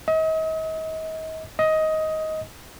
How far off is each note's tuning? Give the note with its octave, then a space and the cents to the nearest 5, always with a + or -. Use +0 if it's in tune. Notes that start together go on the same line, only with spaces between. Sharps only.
D#5 +40
D#5 +15